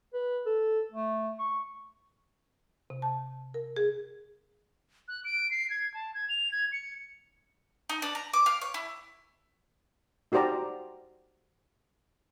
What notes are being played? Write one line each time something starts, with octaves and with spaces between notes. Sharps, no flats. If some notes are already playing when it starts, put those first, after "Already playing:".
B4
A4
A3
C#6
C3
A5
A#4
G#4
F#6
D7
C7
G#6
A5
G#6
F7
G#6
C#7
D#4
D4
A#5
D6
F5
C#5
E4
D#4 F#4 G4 C5 D5 A#5